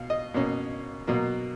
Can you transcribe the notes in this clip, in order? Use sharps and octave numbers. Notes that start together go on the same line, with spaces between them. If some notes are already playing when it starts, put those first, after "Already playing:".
Already playing: B2 F5
D#5
B2 A#3 C#4
B2 F#3 A#3